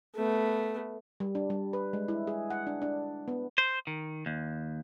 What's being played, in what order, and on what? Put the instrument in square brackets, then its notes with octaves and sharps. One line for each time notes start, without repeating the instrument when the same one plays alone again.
[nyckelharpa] A3 B3
[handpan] G3
D4
G3
B4
G#3
E4
G#4
F#5
D4
D4
B3
[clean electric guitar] C5
D#3
D#2